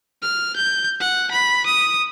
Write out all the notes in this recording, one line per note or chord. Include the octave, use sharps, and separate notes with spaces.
F6
G6
F#5
B5
D#6